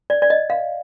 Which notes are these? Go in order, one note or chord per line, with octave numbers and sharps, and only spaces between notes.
D5
D5
D#5
F5